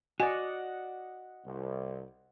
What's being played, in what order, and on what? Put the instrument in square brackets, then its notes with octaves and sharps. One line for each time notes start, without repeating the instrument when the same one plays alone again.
[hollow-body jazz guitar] F#4 D5 [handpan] D#5 F#5 [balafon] G#5
[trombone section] C2